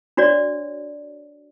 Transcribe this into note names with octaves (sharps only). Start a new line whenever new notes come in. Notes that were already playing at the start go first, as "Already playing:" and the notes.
D4 F#4 C#5 D5